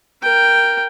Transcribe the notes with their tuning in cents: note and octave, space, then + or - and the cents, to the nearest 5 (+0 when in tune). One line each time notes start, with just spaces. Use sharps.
A#4 +0 G5 +0